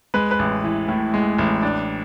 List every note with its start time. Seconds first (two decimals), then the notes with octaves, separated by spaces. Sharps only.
0.14 G#3 B4
0.31 B4
0.39 A1
0.64 E3
0.88 A2
1.14 G#3
1.39 A1
1.62 D4